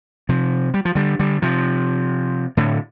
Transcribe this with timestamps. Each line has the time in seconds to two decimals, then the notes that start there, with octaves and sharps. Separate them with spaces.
0.29 C3 F3
0.74 G3
0.85 F3
0.95 D3 G3
1.19 D3 G3
1.42 C3 F3
2.57 A2 D3